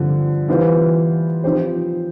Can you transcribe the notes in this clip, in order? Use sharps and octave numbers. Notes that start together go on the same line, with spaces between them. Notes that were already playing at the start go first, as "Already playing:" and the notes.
Already playing: G2 D3 F3 C4
E3 G3 B3 F4 C5
F3 C4 G4 C5